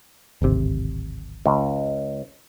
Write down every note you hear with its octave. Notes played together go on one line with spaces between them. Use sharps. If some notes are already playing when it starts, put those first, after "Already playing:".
D1 G#1 C3
C#2